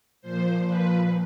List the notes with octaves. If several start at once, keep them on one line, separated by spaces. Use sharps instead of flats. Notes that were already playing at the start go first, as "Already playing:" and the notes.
A#2 F3 C5
B4